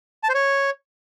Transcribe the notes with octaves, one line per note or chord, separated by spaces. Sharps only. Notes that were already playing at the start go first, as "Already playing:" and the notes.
A5
C5
C#5